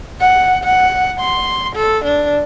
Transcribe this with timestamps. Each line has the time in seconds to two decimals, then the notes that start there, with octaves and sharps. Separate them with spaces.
0.20 F#5
0.64 F#5
1.20 C6
1.76 A4
2.05 D4